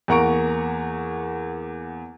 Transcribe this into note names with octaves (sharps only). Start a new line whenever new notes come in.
E2 A#3 F#5 A#5 C#6 D7